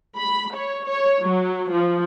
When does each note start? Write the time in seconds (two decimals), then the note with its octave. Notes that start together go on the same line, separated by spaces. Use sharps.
0.16 B5
0.54 C#5
0.87 C#5
1.22 F#3
1.72 F3